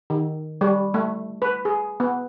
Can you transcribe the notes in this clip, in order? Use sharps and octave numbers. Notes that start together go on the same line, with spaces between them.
D#3
G3
A3
B4
G#4
B3